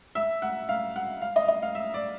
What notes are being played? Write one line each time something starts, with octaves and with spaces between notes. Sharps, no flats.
E5
F#5
F5
F#5
F5
D#5
D#5
F5
E5
D5